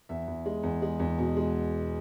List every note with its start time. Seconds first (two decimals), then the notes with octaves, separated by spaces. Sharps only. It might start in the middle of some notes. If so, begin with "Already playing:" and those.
0.09 E2 E5
0.27 E2
0.46 G#3
0.63 E2
0.82 G#3
0.99 E2
1.18 B2
1.37 G#3